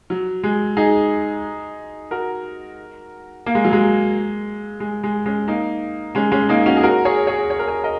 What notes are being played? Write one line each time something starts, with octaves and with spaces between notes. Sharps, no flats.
F#3
G#3
D#4 G#4
F#4 A#4
A#3
G#3
F#3
G#3
G#3
G#3
G#3 C#4
A#3 D#4
G#3 C#4
G#3 C#4
A#3 D#4
C#4 F#4
G#4
F#4 A#4
G#4 C#5
G#4 C#5
C#5
A#4
G#4 C#5
A#4 D#5